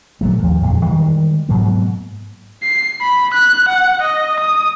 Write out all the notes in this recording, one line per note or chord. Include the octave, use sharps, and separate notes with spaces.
A#2 F#3 A3
D#2 F3
F2 A#2 G#3
D#3 E3 G3 G#3
G#2 B2 F#3 A#3
C7
B5
F#6
F#5
D#5
D#6